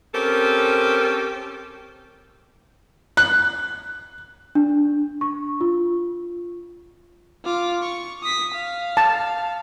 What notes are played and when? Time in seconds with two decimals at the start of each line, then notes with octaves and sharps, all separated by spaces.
0.14 C4 C#4 G4 A4 A#4
3.17 F#6
4.55 D4
5.21 C#6
5.61 F4
7.44 F4 D6
7.82 C#6
8.23 D#6 B6
8.54 F5
8.97 A5